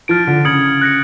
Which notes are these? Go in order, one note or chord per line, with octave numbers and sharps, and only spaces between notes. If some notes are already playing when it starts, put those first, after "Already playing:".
F3 F6 A6 D7
D3
C#3 D#6 G#6 C#7 F#7
F#6 A#6 C#7